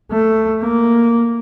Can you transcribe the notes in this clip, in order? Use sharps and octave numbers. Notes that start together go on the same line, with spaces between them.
A3
A#3